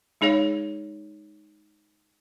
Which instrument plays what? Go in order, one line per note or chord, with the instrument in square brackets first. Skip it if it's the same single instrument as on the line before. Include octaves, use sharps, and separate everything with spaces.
[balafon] G#3 D#4 G#4 C#5 F5